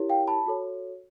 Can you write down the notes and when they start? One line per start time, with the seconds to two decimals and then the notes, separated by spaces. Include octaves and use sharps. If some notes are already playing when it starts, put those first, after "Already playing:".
Already playing: E4 G4 A#4 C#5
0.09 F5 G5
0.28 A5 B5
0.46 F#4 A4 C#5